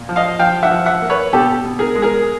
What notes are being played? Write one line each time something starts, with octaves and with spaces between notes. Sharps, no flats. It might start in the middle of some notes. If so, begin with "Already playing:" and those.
Already playing: A#2
F3
D#5 F5
F3 F5 G5
E5 F#5
F3
E5 F#5
A#3
B4 C#5
B2 G4 A4
B2
G#4 A#4
G#3
G#4 A#4